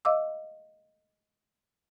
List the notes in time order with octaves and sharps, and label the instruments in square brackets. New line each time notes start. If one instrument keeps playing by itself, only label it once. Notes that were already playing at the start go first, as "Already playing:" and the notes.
[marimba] D#5 F5 D6 E6